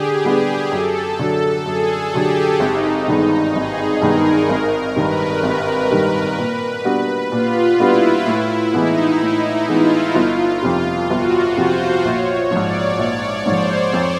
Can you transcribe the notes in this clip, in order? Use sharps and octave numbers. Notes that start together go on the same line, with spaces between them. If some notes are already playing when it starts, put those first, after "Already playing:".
Already playing: D3 G3 G4 G#4
G3 B3 D4 G#4
F#2 A4
D3 F#3 A4
F#2 G#4
D3 F#3 G4
G#1 D#4
G2 D#3 G#3 B3
G#1 G#4
G2 D#3 G#3 B3 A#4
G#1 A#4
G2 D#3 G3 B4
G#1
G2 D#3 G3
A#2
G3 B3 D4 F#4
A#2 F4
G3 B3 D4 E4 F#4
A2 E4
E3 G#3 B3 D#4
A2 E4
E3 G#3 B3 F4
G1
F2 C3
G1 F#4
F2 C3 C5
A#1 C#5
G#2 F3 D5
A#1 C#5
G#2 F3 C5
F2